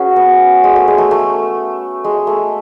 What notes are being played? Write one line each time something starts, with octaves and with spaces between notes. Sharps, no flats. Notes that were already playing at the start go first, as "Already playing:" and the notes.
Already playing: C#4 F#4 G#4 B4
B3
G#3
A3
G#3
A3
A3
G#3
A3